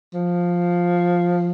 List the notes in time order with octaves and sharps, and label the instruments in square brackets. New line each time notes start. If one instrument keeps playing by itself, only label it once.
[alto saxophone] F3